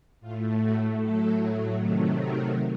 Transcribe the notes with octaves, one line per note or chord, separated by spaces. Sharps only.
A2 A3 F4
F#4
A2 F#3 A3 A4
C3 D#3 F#3 A3
A#4